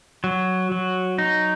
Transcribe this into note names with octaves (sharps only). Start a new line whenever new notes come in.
F#3
F#3
D#4